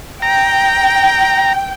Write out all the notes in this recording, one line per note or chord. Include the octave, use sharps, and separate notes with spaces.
G5 A#5